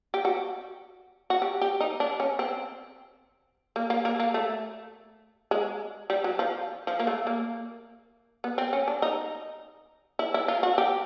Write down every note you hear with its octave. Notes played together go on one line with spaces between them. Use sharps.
G4
F#4
F#4
G4
G4
D#4
D4
C#4
C4
A#3
A#3
A#3
A#3
A3
G#3
G3
F#3
F3
F3
A#3
A3
A#3
B3
C4
C#4
D4
D#4
E4
E4
F4
F#4
G4